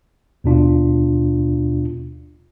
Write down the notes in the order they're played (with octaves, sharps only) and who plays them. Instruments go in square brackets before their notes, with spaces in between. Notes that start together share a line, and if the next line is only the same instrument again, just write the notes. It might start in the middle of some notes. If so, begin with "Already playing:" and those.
[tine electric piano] D#2 B2 D4 F4